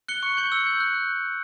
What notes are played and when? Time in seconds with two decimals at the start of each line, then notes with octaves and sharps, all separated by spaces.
0.08 F#6 C#7 G7
0.23 C#6
0.37 G6 C#7 F#7
0.52 E6
0.65 G6 C#7
0.80 F#6